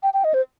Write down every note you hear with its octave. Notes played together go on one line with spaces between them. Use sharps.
G5
G5
D#5
C5